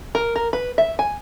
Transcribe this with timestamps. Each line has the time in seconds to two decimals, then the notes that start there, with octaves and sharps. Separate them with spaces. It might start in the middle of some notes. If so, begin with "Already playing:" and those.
0.15 A#4
0.36 A#4
0.53 B4
0.78 E5
0.99 G#5